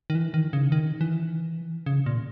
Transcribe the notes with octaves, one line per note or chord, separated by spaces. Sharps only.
D#3
E3
D#3
C#3
D#3
E3
C#3
A#2